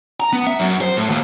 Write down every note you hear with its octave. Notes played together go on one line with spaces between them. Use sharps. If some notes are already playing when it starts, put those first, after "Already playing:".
A#5
B3
E5
F#2
C5
A2
D#2